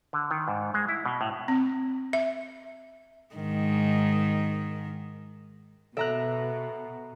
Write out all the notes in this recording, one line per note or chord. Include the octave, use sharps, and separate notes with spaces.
D3
D#3
G#2
G#3
E4
B2
A2
C4
E5
G#2 D#3
B2 A4 E5 A#5 F#6